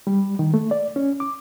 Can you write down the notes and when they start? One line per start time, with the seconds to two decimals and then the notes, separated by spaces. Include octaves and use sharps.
0.07 G3
0.39 D#3
0.54 A3
0.71 D5
0.96 C#4
1.20 D6